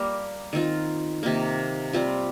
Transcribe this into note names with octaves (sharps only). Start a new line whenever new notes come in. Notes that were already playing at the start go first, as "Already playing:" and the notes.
Already playing: G3 A#3 G4 A#4
D#3 C4 F4
C3 D#3 A#3
G3 C4 F4